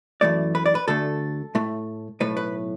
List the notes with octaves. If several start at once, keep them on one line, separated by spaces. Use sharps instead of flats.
F#2 E3 A3 D5
B4
D5
B4
D2 D3 A3 A4
A2 A3
B1 A2 A3 B4
B4